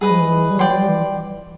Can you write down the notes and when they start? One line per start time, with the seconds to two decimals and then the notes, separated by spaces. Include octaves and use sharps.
0.01 G3 G#4 B4 D#5
0.10 F3
0.20 E3
0.51 G3
0.59 F#3 D5 G5 C6
0.69 F#3
0.78 G3
0.89 E3